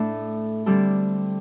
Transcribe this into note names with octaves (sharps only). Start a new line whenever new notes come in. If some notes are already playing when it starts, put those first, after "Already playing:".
Already playing: A2 A3 D4 A4
D3 G3 C4 A4